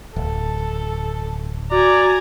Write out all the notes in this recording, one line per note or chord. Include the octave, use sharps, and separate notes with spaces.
D1 A4
F#4 D5 G#5 A#5